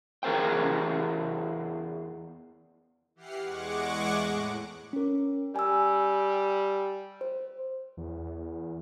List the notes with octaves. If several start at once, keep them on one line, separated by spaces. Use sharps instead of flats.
E2 G#4 A#4 C5 G5
E3 G4 F#5 F6 C7
E2 G#3 F#5 C#6 D6
A2
C#4 A#4
G3 G#5 E6
C5
E2